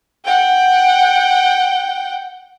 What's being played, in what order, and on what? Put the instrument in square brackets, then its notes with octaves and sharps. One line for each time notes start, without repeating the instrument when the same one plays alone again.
[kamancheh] F#5 G5